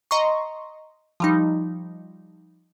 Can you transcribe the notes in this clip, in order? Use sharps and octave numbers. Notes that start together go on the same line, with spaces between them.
D#5 A#5 C6 C#6
F3 G3 D#4